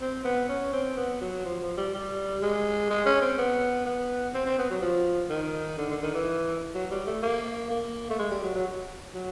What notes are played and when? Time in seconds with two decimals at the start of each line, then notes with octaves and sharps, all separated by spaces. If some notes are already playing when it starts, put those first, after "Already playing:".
0.01 C4
0.24 B3
0.49 C#4
0.72 C4
0.97 B3
1.21 F#3
1.45 F3
1.62 F3
1.77 G3
1.94 G3
2.42 G#3
2.90 G#3
3.06 C#4
3.21 C4
3.38 B3
3.85 B3
4.34 C4
4.46 C4
4.58 B3
4.70 F#3
4.81 F3
5.30 D#3
5.78 D3
5.90 D3
6.02 D#3
6.14 E3
6.74 F#3
6.91 G3
7.06 A3
7.22 A#3
7.70 A#3
8.10 A3
8.19 G#3
8.31 G3
8.43 F#3
8.55 F#3
9.14 F#3